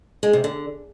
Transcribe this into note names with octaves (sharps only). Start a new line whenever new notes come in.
G#3
C3
D3